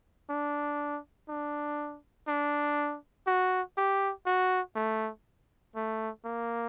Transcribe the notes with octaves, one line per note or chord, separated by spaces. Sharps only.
D4
D4
D4
F#4
G4
F#4
A3
A3
A#3